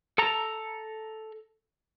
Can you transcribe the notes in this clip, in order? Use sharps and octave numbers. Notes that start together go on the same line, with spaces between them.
A4 A5 A#5